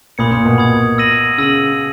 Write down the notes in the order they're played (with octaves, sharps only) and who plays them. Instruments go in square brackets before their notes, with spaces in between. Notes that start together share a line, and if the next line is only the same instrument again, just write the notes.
[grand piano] A#2 [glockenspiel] B5 D#6 G#6 C#7
[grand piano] A#2
B2
[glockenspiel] B5 D#6 G#6 C#7
E6 A#6 D#7 F#7
[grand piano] C#3 [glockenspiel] E6 A#6 D#7 F#7